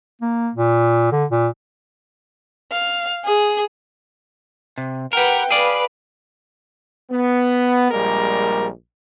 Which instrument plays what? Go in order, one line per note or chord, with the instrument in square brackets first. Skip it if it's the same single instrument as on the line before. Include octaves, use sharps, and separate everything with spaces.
[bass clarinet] A#3
A#2
D3
A#2
[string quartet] F5
G#4
[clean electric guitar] C3
[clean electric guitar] G4 A#4 [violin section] B4 F#5 G5
[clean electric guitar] G#4 D5 [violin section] B4 F5
[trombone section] B3
A#1 G3 G#3 A#3 A#4